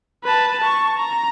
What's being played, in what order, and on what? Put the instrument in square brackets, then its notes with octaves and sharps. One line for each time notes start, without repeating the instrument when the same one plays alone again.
[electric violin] B4 A5
A5 C#6
A#5